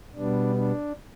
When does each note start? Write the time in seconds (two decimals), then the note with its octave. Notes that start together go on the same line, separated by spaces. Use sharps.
0.15 B2 G3 B3 D4
0.56 D4